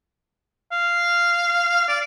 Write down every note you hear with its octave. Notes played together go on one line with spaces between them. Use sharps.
F5
D5